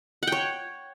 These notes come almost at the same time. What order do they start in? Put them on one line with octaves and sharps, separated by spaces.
F#5 G5 C#5